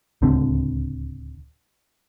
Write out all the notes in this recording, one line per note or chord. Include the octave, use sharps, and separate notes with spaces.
D1 C#2 D3 C4